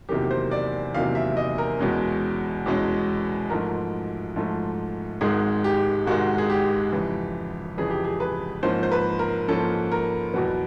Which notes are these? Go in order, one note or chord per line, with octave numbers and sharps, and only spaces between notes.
E2 C3 D#3 F#3 A#3 G4
C5
D5
E2 C3 D#3 F#3 A#3 F5
E5
D#5
A#4
E2 B2 G#3 C#4
E2 B2 G#3 C#4
G#2 F3 A3 A#4
G#2 F3 A3
G#1 G#2 D#3 G#3 G#4
G4
G#1 G#2 D#3 G#3 F#4
G#4
G4
F2 C#3 E3
F2 C#3 E3 G#4
G4
G#4
B4
G#2 F3 A#3 C#4 C5
C5
B4
A#4
G#2 F3 A#3 C#4 A4
A#4
E2 B2 F#3 B3